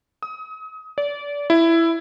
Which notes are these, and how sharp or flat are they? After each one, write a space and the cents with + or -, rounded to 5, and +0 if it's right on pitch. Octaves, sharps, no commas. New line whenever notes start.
D#6 +30
D5 -30
E4 +10